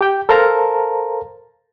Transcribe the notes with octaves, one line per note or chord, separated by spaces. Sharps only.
G4 G5
A4 A#4 C5 F5 A5 A#5